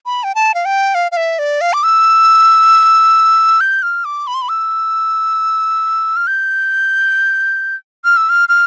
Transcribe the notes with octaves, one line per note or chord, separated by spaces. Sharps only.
B5
G5
A5
F5
G5
F5
F5
E5
D5
F5
D6
E6
G6
F6
D6
B5
C6
B5
E6
F6
G6
F6
E6
F6
F6